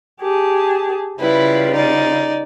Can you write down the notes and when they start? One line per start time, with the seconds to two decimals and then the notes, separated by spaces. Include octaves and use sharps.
0.21 G4 G#4 A5
1.20 C#3 G3 E4 F4 B4
1.73 D#4 D5